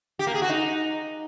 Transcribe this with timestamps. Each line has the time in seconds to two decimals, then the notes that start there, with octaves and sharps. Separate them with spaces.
0.19 G4
0.27 A#3
0.34 G#4
0.42 F#4
0.49 D#4